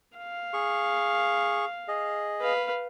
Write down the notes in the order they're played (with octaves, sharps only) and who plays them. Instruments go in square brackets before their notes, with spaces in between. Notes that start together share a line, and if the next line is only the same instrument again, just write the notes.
[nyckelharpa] F5
[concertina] G#4 C#6
G#4 D#5
[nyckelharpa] B4 F5